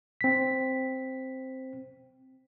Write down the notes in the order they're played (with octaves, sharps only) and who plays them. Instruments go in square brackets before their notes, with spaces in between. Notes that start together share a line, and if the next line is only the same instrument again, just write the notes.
[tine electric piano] C4 B6